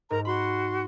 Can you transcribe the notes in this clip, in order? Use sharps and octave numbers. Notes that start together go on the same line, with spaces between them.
G#2 A#4 A#5
F#4 B5 C6